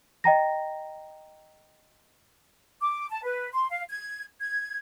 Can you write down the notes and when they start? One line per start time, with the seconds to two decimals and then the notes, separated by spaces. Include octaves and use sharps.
0.24 D#5 G5 A#5 A#6
2.81 D6
3.10 A5
3.24 B4
3.53 C6
3.70 F5
3.89 G#6
4.40 G#6